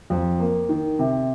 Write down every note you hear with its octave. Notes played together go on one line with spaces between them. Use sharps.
F2
A#3
D#3
C3